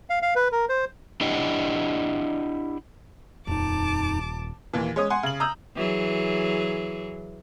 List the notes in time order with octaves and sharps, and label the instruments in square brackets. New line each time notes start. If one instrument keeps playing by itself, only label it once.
[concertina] F5
F5
B4
A#4
C5
[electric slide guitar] D4 E4 G4 D#5 F#5 G5
[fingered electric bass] D#1 [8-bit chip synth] F2 D#4 [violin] A5 D6
[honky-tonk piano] D#2 A#2 E3
G#3 C#4 C#5 D#6
F#5 G#5 C6
C#3 F#7
A#5 D#6 E6 G6
[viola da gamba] E3 F#3 G#4